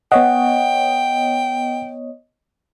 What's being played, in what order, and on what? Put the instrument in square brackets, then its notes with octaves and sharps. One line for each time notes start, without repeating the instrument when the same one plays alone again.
[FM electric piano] B3 C#5 D#5 [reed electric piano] F#5 [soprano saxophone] G5